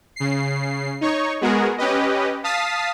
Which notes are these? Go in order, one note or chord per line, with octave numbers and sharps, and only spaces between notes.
C#3 C7
D#4 C#5 C#6
G#3 B3 F#4 G#4 A#4
C#4 G4 B4 D#5
F5 A5 D#6 A6 B6 C7